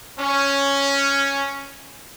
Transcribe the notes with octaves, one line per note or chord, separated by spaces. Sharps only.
C#4